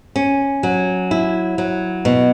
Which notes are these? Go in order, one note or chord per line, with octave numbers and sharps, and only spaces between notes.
C#4
F#3
E4
F#3
B2